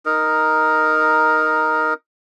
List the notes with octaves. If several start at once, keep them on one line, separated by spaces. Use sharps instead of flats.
D#4 A#4